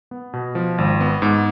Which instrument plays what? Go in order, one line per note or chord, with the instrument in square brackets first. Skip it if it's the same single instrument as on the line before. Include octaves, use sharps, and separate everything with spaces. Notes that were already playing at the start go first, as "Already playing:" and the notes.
[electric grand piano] B3
B2
F3
G#1
B3
G#2